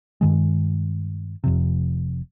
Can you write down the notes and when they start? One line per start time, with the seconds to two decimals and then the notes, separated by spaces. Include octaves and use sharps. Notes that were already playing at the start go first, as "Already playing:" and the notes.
0.21 G2 D#3 G#3
1.44 F1 F2 C3